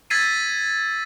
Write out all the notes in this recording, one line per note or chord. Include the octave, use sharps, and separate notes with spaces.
E6 G#6 A6 B6 C7 D#7